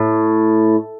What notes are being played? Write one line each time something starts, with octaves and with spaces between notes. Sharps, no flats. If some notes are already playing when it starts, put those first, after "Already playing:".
Already playing: A2